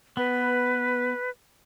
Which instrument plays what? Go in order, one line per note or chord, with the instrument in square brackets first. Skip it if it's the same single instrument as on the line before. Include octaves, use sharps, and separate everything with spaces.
[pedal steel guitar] B3 [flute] B4